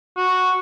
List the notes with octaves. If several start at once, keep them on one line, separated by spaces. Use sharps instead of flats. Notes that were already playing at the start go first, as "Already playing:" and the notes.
F#4